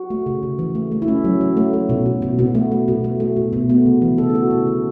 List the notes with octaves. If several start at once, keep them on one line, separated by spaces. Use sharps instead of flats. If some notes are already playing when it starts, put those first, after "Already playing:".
Already playing: F#4
A3
C#3
C#3
E3
A3
A3
E4
A3 C#4
F#3
F#3
A3
A3
B2
B2
B2
B2 B3
A3
A3
B2
A3
A3
B2
B2
A3 B3
C#3
E3
C#3 A4
E4
A3 F#4
C#3
C#3